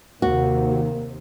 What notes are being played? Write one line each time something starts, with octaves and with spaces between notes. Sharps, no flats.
D#2 C3 D#3 A#3 F#4